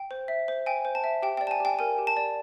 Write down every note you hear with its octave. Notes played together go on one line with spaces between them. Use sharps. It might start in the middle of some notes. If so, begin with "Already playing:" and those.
Already playing: G5
C5
E5
C5
G5 G#5
C5
A5
E5
G4 G5
G5
D5
A5
G#5
G4 G5
A#4 G#5
G4
A5
D5